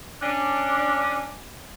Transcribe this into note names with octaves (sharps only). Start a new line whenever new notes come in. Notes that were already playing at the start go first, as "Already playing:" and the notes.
C#4 D4